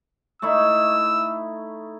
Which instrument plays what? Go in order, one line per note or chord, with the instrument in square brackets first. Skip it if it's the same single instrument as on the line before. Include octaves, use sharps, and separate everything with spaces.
[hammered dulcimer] A3 D#4 E4 [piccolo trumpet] E6